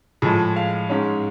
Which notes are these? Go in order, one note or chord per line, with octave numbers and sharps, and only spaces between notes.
A2 F3 G#3 G#4
F5
G#2 G#3 C#4